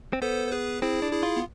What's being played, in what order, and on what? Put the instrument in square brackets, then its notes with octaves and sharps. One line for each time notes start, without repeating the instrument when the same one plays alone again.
[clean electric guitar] C4
[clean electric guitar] B3 [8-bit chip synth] A4 C5
[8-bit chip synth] C5
G#4 B4
[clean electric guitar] C4 [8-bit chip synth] E4 G#4
[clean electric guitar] D4
[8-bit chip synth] E4 G#4
[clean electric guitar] F4
[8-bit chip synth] B3